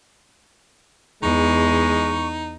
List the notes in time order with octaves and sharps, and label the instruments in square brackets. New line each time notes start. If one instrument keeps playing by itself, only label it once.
[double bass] E2 [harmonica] G#3 [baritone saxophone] D#4 [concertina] C#6